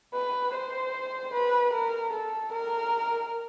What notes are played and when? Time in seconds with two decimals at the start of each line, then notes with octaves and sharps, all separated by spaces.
0.14 B4
0.54 C5
1.33 B4
1.73 A#4
2.12 A4
2.52 A#4